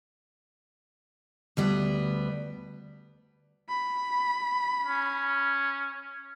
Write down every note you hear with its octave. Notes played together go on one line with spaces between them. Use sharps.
D2 G3 B3
B5
C#4